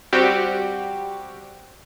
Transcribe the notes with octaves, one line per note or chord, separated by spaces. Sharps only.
G3 C4 F#4 G4